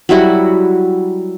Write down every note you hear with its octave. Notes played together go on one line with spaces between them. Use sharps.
F#3 G3 E4 F#4